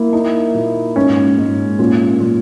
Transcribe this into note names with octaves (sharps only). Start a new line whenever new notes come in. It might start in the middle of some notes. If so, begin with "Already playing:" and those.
Already playing: A#3 E4
D#4
A#2
G#2 C#4
G#2
A#2 C#4
A#2